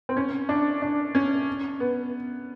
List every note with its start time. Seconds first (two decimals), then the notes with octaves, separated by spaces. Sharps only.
0.09 C4
0.17 C#4
0.49 D4
0.82 D4
1.15 C#4
1.80 B3